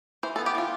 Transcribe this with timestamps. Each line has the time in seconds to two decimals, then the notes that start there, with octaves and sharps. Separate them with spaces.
0.23 E3 C5
0.36 A4
0.38 B3
0.46 G4
0.55 E3 F4